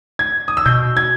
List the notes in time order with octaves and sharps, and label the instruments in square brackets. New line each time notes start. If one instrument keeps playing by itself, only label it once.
[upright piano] G#6
D#6
E6
[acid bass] B2 [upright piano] G6
[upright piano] G#6